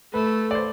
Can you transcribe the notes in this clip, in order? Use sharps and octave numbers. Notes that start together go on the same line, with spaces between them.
A3 B4
D5
C5